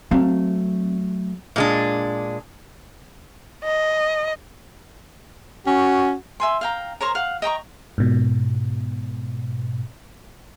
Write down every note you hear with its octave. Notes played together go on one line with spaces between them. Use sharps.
F#3 A3 C4 F5
A#2 G#3 D4
D#5
C#4 F#4
E5 G#5 C6
F5 G5 A#5
A#4 C5 C#5 A#5
F5 F#5
D#5 G5 A#5 C#6
G#2 B2